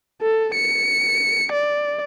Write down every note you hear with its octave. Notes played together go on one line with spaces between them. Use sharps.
A4
C#7
D5